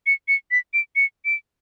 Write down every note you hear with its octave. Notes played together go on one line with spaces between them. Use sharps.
C#7
C#7
B6
D7
C#7
D7